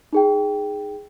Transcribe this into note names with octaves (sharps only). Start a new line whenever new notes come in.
D#4 G#4 G5